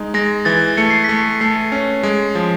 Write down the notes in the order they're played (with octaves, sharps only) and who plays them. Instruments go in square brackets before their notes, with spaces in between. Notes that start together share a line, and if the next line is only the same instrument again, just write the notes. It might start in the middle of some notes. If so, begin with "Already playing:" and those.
Already playing: [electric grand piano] G#3 D#4
[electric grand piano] G#3 [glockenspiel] A#6
[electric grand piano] E3 [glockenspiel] A6
[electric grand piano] A3 [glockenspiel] C#7
[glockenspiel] C7
[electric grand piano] A3 [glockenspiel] B6
[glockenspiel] C7
[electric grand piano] A3 [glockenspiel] C7
[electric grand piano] C#4
G#3
F3